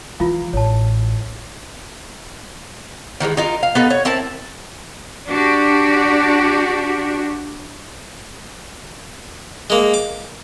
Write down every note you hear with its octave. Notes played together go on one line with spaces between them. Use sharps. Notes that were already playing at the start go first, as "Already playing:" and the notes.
E3 F3 E4 F4 F5
A1 C#5 A5
D#3 E3 F#3 G#3
D#4 F4 A#4
F5
B3 D#4 A4
C#5
C4 E4 A#4 A5
D4 F#4 G4
G#3 A#3
D6